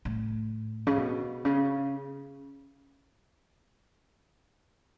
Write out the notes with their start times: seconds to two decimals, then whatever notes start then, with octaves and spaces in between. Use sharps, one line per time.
0.05 A2
0.87 C#3
0.98 B2
1.45 C#3